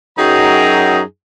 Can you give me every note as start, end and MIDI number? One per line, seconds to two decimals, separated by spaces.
0.18 1.01 42
0.18 1.01 54
0.18 1.01 63
0.18 1.01 68
0.18 1.01 79
0.18 1.01 82